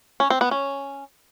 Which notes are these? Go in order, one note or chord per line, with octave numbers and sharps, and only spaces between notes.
C#4
C4
B3
C#4